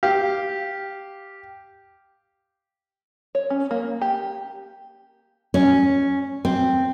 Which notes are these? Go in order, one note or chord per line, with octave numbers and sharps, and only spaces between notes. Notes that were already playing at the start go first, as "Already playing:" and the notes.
G4 F5
C#5
C#4
A#3
G4
C#4
C4